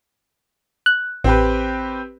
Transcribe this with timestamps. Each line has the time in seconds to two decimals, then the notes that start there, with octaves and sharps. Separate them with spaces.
0.86 F#6
1.24 A1 C4 G4 B4